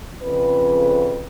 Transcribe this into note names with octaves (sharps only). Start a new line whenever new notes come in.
F2 C#3 B4